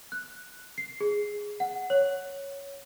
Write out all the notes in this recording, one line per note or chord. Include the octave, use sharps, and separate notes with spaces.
F#6
C7
G#4
F#5
C#5